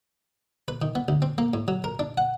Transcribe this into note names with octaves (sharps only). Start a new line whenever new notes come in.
B4
D#3
B3
D2
C4
A#3
A2
F#3
A#4
D4
F#5